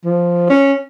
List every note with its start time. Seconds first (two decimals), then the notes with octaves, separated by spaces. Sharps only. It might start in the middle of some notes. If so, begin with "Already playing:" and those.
0.05 F3
0.50 C#4